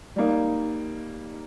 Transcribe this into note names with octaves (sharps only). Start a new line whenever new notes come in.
G3 A#3 D#4